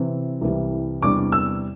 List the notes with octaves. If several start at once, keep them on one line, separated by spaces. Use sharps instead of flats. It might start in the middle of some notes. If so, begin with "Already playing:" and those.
Already playing: C3 E3 C4
C2 C3 E3 G3
E2 C3 G3 D4 D6
E6